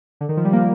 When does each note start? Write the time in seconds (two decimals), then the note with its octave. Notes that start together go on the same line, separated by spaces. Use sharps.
0.21 D3
0.29 D#3
0.37 F3
0.45 G3
0.53 A#3